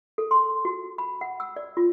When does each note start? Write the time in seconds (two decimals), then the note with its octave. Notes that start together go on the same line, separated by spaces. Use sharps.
0.18 A4
0.31 C6
0.65 F#4
0.98 B5
1.21 F#5
1.40 E6
1.56 D5
1.77 F4